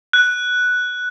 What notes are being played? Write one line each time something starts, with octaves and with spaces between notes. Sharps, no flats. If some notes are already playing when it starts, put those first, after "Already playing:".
F#6